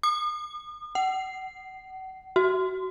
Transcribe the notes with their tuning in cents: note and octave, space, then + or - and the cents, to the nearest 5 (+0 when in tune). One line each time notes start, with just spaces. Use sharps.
D#6 -40
F#5 +35
F#4 +20